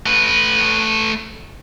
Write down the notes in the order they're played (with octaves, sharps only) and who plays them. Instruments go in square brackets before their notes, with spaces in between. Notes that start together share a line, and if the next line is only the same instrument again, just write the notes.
[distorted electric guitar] A3 B4